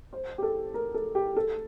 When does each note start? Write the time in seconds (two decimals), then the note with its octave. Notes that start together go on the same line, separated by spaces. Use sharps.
0.13 C5
0.38 G4
0.42 A4
0.74 A#4
0.94 A4
1.15 G4
1.37 A4